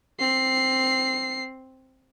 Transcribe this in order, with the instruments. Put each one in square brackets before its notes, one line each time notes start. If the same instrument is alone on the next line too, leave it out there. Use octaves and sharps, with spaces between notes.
[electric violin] C4 C7